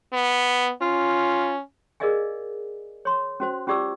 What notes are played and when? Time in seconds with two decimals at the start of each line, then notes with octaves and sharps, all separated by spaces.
0.13 B3
0.81 C#4 F4
2.00 G#4 A#4 D5 D#5 F5 G#5
3.05 C#5 C6
3.40 C#4 F#4 C5
3.67 C#4 F4 G4 D5 D6 E6